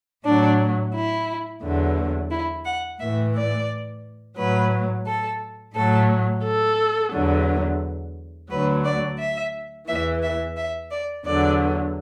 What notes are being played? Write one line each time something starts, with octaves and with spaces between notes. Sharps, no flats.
A2 F#3 D4
E4
E2 D3 F#3
E4
F#5
A2 E3 E5
D5
A2 F#3 B4
A4
A2 F#3 A4
A4
E2 D3 F#3
D2 D3 F#3 B4
D5
E5
E2 E3 E5
E5
E5
D5
E2 D3 F#3 D5